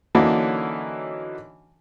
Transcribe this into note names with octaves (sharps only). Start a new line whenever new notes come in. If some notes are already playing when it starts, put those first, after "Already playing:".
D3 E3 F#3 A#3 C#4 D#4